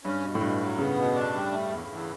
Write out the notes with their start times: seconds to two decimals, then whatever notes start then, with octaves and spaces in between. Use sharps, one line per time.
0.04 G2 C#4
0.22 B2
0.35 A2
0.41 G2 B2
0.60 F#3
0.78 C#3 B3
0.97 B2
1.14 D4
1.33 G3
1.52 A3
1.70 E2
1.89 E2